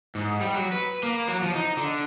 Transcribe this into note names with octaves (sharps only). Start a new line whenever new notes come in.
G#2
G3
F#3
B4
A#3
F#3
F3
D#4
D3